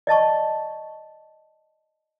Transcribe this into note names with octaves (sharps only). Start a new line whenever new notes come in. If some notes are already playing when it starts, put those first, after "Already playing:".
D5 D#5 A5 C#6